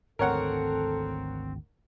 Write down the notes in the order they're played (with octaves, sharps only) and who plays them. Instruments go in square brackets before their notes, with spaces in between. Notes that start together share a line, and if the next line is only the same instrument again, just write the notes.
[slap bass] G#1 D2 G#2 [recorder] C4 [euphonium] A4 [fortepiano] A#4 C#5 F#5